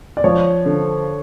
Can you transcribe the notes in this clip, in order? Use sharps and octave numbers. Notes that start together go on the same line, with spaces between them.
D5
F3 C#5
D3